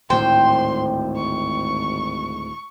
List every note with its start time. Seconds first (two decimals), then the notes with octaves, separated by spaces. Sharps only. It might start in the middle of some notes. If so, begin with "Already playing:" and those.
0.10 G#1 D2 A2 G#3 C5 G5 C6
1.17 C#6